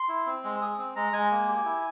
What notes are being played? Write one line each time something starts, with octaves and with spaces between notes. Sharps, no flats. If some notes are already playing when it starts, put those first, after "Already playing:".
Already playing: C6
E4
C4
G#3
G#4
C4
G#3 A#5
G#3 G#5
A#3
G4
E4